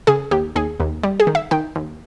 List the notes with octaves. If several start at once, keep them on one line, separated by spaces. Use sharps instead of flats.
C#3 G#4
D#2 G4
D#2 G#4
D#2
G3
G#4
D#3
E5
D#3 G5
D#2